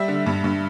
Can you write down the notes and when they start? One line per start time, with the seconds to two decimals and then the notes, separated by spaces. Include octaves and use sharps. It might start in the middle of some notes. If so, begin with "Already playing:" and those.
Already playing: G3 E5
0.08 D3
0.26 G2
0.44 G2